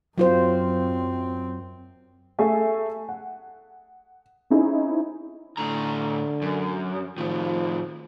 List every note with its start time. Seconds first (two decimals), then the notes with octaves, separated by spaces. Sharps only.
0.18 F#2 F#3 C4 F4 C5
2.39 A3 G#4 E5 G#5
3.09 F#5
4.50 C4 C#4 D#4 E4 G#4
5.57 A2 D3 A#5
6.42 F#2
7.18 A2 D#3 F3